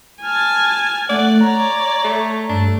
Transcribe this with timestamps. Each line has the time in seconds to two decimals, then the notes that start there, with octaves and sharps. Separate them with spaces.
0.22 G#5 A5 F6
1.10 A3 D5 F#5
1.41 C#5 A#5
2.04 A3
2.49 G2 A3 D4